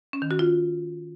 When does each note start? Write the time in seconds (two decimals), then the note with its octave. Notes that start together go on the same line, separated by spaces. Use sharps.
0.13 C#4
0.22 D#3
0.31 F#4
0.39 F4